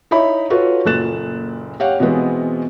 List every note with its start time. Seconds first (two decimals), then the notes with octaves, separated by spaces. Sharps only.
0.11 D#4 E4 C#5 E5 B5
0.50 F4 F#4 A4 B4 C#5
0.85 F#1 A#2 A4 F#6 A6 E7
1.80 G4 C#5 F5 F#5
2.00 B2 E3 G#3 B3 C4